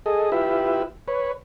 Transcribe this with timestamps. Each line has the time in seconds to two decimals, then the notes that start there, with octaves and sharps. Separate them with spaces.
0.06 G#4 A4 D#5
0.32 E4 F4 G4 B4 E5
1.08 B4 C#5